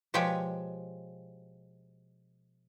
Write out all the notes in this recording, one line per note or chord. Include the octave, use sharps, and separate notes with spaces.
B2 F3 G#3 G4 C#5 G5